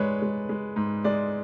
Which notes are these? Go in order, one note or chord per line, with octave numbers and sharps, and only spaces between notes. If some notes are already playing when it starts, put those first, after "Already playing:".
Already playing: G#2 G#3 B4 C#5 D5
G#3
G#3
G#2
G#3 D5